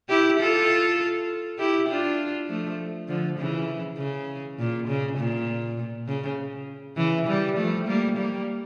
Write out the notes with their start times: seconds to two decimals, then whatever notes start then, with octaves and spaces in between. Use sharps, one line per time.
0.09 E4 G4
0.40 F4 A4
1.59 E4 G4
1.89 D4 F4
2.48 F3 A3
3.08 D3 F3
3.39 C#3 E3
3.98 C#3
4.59 A#2
4.88 C#3
5.18 A#2
6.08 C#3
6.97 C#3 E3
7.27 E3 G3
7.57 F3 A3
7.87 G3 A#3
8.17 G3 A#3